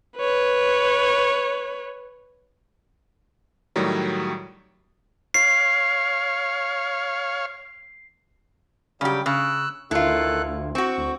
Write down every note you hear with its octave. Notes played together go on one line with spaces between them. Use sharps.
B4 C#5
A2 D#3 F#3 G3
C#5 F5 C7
C#3 F#3 G3 G4
C#3 E6 F#6
D2 D#3 E4 F4 A4 F#6
C4 F#4 C#6
D2